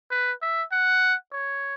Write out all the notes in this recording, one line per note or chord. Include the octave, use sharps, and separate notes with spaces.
B4
E5
F#5
C#5